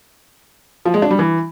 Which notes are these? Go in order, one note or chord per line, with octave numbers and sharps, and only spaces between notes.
F3
G#3
D4
G3
E3